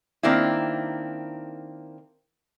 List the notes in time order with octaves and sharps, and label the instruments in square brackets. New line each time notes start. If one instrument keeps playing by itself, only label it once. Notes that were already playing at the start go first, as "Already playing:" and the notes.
[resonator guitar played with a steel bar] D#3 A#3 C4 D4 E4